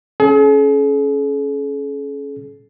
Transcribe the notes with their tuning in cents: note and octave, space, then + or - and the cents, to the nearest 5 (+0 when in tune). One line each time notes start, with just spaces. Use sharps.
C#4 +0 G#4 +45